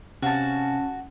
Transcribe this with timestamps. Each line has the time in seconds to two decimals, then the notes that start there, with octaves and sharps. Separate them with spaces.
0.22 C3 C#4 F#4 F5 G#5 A5